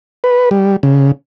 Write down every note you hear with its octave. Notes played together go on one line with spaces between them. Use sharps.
B4
G3
C#3